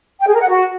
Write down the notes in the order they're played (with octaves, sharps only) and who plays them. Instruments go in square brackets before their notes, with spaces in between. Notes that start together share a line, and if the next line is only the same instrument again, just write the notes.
[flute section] G5
G#4
A#4
F#5
F#4